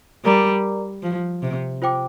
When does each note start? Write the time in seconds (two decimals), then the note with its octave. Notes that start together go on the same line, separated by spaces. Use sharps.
0.25 G3 A#4 D5 A#5 D6
1.03 F3
1.43 C3
1.82 F4 C5 G5 D6